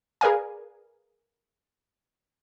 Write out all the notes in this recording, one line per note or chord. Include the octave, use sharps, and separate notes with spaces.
G#4 A#4 B4 D5 F5 G#5